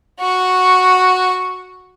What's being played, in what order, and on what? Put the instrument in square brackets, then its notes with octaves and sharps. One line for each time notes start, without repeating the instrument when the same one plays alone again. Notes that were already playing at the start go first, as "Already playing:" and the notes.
[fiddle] F#4 C#6